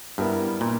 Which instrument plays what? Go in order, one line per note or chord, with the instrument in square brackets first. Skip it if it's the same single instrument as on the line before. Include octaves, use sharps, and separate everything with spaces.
[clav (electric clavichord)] G2 [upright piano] G3 B3 E4 A#4 E5
[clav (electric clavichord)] A#2